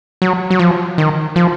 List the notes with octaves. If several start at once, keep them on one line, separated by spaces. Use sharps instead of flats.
F#3
F#3
F3
D#3
F3